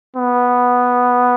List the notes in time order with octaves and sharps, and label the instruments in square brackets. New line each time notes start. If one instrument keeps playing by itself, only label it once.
[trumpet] B3